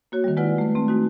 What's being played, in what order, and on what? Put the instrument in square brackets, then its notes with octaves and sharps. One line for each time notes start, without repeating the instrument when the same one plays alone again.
[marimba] A#3 F#4 C#5
D#3 G3
G#3 E4 F4 B4 D5 F#5
A3 B4
A3 C4
G#3 D#4 F#4